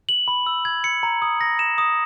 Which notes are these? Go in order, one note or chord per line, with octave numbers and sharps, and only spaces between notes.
F#7
B5
E6
G#6
C#7
A#5
D#6
A#6
E7
D#6